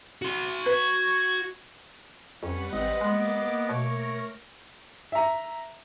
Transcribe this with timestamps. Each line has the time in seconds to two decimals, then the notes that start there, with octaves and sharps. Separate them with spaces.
0.22 F#4 C6
0.66 B4 G#6
2.43 F2 G3 C#4 B4 F#5
2.73 G#1 C4 D#5
3.01 G#3 A#3 B3 D6
3.69 B2 A3 A#4 C#5 A#5
5.12 E5 A#5